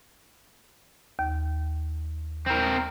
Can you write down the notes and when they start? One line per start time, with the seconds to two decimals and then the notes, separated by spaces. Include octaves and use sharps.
1.19 D#2
2.46 C4 A#4